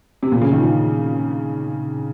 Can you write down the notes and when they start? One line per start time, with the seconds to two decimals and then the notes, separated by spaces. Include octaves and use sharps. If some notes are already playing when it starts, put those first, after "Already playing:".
0.23 C3
0.32 A#2
0.42 C#3
0.51 D#3
0.60 F3